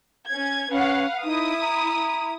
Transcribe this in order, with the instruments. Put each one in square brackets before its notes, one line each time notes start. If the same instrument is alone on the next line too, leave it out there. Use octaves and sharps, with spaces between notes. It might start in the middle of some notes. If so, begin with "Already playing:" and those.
[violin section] C#4 G#6
[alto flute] C#4 [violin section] B4 F5 F#5
[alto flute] D#4 [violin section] E4 D#6
[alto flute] A#5